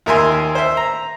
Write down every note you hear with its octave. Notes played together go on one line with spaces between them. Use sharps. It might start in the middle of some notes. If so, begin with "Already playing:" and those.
D#2 A#4 E5 G#5 C6
C5 E5
A#5